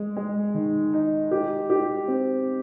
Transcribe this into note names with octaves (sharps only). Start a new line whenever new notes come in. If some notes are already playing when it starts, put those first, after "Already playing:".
Already playing: G#3
G#3
D#3
D#4
G4
G4
C4